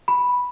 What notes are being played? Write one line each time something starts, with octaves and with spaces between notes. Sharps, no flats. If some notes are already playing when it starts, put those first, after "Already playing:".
B5